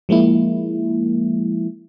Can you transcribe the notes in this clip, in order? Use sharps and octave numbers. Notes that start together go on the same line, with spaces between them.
F3 G#3 A#3 E4